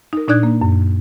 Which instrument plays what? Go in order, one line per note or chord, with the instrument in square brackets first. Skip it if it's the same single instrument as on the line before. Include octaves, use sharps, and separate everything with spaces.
[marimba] D#4 A#4
A#2 D4 D#4 D5 F#6 G#6
A#3
F#2